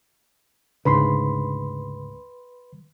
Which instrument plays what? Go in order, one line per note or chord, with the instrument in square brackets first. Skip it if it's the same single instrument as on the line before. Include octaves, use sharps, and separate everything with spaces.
[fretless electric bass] D2 G#2 C#3 [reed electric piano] B4 B5 C6